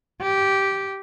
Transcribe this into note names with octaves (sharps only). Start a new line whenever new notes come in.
G4